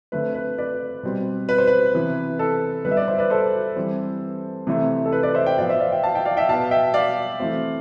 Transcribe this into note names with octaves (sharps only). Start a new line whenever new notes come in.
D3 A3 C4 B4
B4
B4 D5
B2 G3 C4
B4
C5
B4
C3 E3 B3
A4
D3 G3 B3 B4
E5
B4 D5
C5 E5
B4 D5
A4 C5
E3 G3 C4
C3 E3 A3 C4
A4
B4
B4 D5
C5 E5
E5 G5
A2 F3 B3 D5 F5
C5 E5
D5 F5
E5 G5
F5 A5
E5 G5
D5 F5
E5 G5
B2 B3 F5 A5
E5 G5
D5 F5
E3 A3 C4